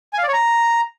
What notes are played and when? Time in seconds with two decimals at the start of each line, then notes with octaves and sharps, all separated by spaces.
0.13 G#5
0.18 F5
0.23 D5
0.28 C#5
0.33 A#5